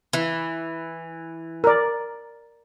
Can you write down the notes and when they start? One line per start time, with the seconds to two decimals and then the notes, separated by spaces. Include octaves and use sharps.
0.13 E3
1.64 A#4 D5